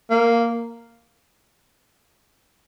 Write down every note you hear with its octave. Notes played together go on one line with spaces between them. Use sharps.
A#3